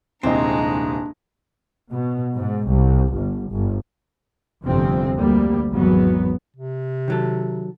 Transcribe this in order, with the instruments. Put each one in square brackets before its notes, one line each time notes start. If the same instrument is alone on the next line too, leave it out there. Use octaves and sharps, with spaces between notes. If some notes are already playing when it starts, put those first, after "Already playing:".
[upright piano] D#1 C2 D#5 [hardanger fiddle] G#3 A#5 [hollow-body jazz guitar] C4 [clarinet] D4
[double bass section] B2
G#2
C2
G1
G1
G1 F2 C3 F3 C4
D2 G3 A#3
G#1 E2 F#3 B3
[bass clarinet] C3
[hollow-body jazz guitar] D#3 F#3 A4